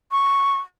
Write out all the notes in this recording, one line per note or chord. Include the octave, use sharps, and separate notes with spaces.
C#6